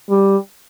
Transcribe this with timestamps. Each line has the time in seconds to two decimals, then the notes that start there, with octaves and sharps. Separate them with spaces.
0.10 G3